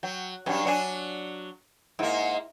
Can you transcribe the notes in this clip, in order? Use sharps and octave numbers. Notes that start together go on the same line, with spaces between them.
F#3 G5
G2 F#3 C#4 G4
F#3 D4 C#5 G#5
G#2 A#3 E4